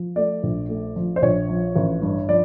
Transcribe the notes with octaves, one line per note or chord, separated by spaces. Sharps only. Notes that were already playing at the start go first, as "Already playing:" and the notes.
Already playing: F3
A3 D5
A#1
A3
F3
C5
A#1 C#5
F3
A1
G2
F3 D5